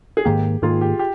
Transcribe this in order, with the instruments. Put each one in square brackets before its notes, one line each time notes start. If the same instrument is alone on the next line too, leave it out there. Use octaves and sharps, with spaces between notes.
[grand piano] G#4
[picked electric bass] G#2 D#3 A#3 [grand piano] G4
[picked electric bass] G#2 D#3 A#3 [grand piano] F4 G#4
[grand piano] G4
G4